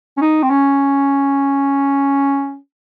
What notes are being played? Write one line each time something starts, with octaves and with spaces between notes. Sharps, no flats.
C#4
D#4
C4
C#4